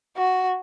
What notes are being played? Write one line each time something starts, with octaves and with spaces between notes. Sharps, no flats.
F#4